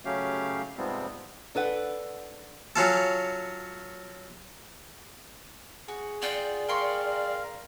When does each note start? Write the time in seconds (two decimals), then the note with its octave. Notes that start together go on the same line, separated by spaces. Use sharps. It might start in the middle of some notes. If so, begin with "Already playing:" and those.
0.05 C#3 F#3 A3 C#4 G4 F5
0.77 G#2 C3 F3 G3 B3 C4
1.55 D4 A4 B4 F#5
2.76 F#3 C#4 F4 A4
5.88 F#4 G#4
6.22 F4 D5 F#5 G5
6.68 A#4 F5 G5 C6 C#6